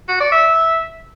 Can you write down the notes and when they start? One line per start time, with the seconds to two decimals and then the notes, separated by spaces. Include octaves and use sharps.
0.09 F#4
0.20 D5
0.32 E5